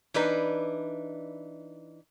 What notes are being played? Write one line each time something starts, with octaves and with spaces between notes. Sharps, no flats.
E3 D4 D#4 B4